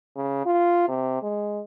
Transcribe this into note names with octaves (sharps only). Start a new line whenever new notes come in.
C#3
F4
C3
G#3